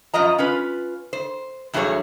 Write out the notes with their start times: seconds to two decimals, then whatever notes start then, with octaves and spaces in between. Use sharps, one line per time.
0.14 F#2 F3 F4 D#5 A#5
0.38 C#4 F4 B4
1.13 C5
1.73 E2 G2 F#3 A3 G#4 C#5